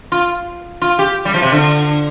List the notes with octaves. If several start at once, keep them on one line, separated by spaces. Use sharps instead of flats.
F4
F4
G4
G3
F3
C3
D3